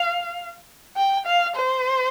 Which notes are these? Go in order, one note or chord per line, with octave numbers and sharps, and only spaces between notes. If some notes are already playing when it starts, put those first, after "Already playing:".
Already playing: F5
G5
F5
C5